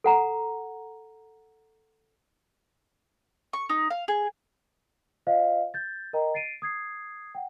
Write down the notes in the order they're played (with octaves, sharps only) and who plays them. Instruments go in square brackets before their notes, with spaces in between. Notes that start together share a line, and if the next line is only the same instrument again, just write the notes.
[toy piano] A4 F#5 A#5
[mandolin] C#6
D#4
F5
G#4
[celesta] F4 C5 D#5 F5
G6 A6
A#4 D#5 G5 A#5
A6 C7 D7 D#7
D#6 G#6 C7
F#5 G5